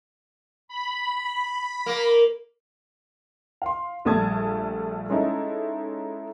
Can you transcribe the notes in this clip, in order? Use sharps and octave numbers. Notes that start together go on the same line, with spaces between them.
B5
A#3
F5 C6
A#1 G3 A3 A5 D#6 G#6
G#3 C#4 D#4 E4 A4